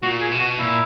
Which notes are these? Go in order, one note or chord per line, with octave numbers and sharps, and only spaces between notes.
A#2 F#4
G#4
B2
F#4
A#2 E4